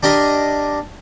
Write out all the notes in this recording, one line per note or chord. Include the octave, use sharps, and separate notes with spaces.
D4 G4 A#4 D#5